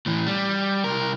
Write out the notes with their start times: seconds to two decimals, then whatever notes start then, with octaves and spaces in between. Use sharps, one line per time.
0.06 A2 E3
0.26 G3
0.84 C2 A#4